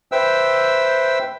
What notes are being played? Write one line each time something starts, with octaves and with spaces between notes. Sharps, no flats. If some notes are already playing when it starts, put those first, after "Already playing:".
B4 C5 E5 G5 E6